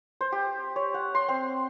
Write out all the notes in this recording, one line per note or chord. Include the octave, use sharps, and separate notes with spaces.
C5
G4
C#5
F#5
C6
C4